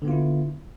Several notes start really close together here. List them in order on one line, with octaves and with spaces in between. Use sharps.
D3 B3 F4 E4